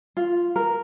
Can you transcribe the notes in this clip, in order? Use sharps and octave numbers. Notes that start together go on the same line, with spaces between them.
F4
A#4